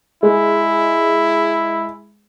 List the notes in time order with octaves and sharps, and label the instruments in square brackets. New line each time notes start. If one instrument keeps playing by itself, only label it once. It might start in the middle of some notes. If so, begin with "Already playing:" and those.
[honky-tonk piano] G#3 [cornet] E4